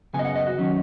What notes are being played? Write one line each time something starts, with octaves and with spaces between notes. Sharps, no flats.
F#2 C#3 B3 G#5
D#5
F#5
D#5
F#4
D#3 F#3 C#4